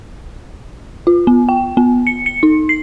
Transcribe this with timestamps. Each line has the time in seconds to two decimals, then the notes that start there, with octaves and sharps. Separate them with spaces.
1.07 F4
1.27 B3
1.49 G5
1.77 B3
2.07 C#7
2.26 C#7
2.43 D#4
2.69 C7